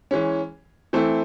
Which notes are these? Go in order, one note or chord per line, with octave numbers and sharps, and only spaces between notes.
E3 G#3 C#4
E3 A3 C4 E4